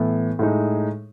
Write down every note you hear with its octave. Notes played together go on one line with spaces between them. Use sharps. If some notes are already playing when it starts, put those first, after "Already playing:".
Already playing: A2 E3 B3
A2 G#3 D#4